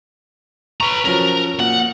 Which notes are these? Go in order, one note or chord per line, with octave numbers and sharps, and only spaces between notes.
B4 A#5 C#6
F3 F#3 C#4 A#4
A#2 F#5